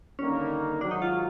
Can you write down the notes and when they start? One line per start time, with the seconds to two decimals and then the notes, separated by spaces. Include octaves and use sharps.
0.19 D#2 D3 G3 A#3 C#4 D#4
0.81 G#2 D#3 F#3 D4
0.91 D#4
1.02 F4